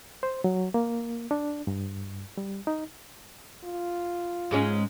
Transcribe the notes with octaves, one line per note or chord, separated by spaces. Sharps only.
C5
F#3
A#3
D4
G2
G3
D#4
F4
G#2 G#3 C#4